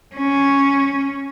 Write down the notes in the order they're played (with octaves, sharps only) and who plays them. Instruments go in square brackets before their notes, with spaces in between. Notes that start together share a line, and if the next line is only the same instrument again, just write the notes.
[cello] C#4